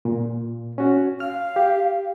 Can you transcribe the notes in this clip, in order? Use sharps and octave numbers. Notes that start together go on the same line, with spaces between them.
A#2
C#4 F#4
F5 F6
G4